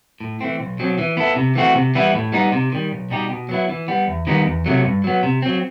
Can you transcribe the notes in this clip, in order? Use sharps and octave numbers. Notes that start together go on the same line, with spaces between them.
A2
E3 A3 C4
B1
B2 F#3 C4
E3
B3 E4 A4
C3
E3 A3 C4 F#4
C3
E3 G3 B3 E4
A2
G3 B3 D#4
C3
D#3 G3
B1
B2 G3 D#4 G4
B2
F#3 B3 E4
E3
G3 B3
E2
D#3 G3 B3 D#4
E2
C3 F#3 A3
G2
F#3 B3
C3
F#3 C4